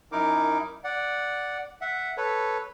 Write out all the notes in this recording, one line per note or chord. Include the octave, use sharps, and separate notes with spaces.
F#2 D#4 E4 A#4 D6
D5 F#5
E5 F#5
A4 B4 C#5